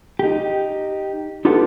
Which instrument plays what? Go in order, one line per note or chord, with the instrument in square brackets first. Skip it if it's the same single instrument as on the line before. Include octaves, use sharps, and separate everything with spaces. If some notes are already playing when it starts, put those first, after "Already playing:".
[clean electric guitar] D#4 G4
D#4 F4 G4 A4 B4 F#5